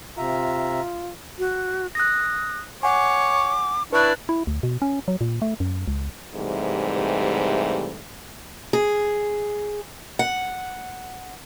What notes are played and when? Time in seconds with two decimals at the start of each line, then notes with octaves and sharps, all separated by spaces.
0.18 C3 F4 E5 A#5
1.39 F#4
1.95 D#6 F#6 A#6
2.83 C#5 F#5 G#5 D6
3.92 D4 E4 B4 C#6 F#6
4.29 E4
4.47 D2
4.63 B2
4.82 C#4
5.08 F#3
5.21 A#2
5.42 A3
5.60 F#2
5.88 C#2
6.35 G#2 C3 E3 G3 A3
8.73 G#4
10.19 F#5